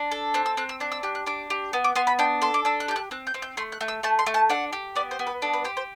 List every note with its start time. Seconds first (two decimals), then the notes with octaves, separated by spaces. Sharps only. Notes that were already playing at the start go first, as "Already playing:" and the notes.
Already playing: D4
0.12 A4
0.34 C4 F#6
0.46 E6
0.57 C4 F#6
0.69 E6
0.80 D4 F#6
0.92 E6
1.03 G4 F#6
1.15 F#6
1.26 D4 D6
1.50 G4
1.73 B3
1.84 D6
1.96 B3 C6
2.07 B5
2.19 D4 G5
2.42 A4 C6
2.54 D6
2.65 D4 E6
2.80 F#6
2.88 G4 G6
2.96 F#6
3.11 C4 F#6
3.27 G6
3.34 C4
3.42 G6
3.57 A3 C6
3.72 F#6
3.81 A3
3.88 E6
4.03 A3 A5
4.19 C6
4.26 A3
4.34 A5
4.50 D4 F#5
4.73 G4
4.95 B3 D5
5.11 C5
5.19 B3
5.27 B4
5.42 D4 A4
5.54 B4
5.65 G4 C5
5.77 C5